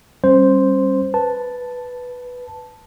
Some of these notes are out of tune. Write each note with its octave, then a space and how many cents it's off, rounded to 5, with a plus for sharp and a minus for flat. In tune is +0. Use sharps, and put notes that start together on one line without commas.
G3 +0 C#4 -40 C5 +0
B4 +0 A5 +0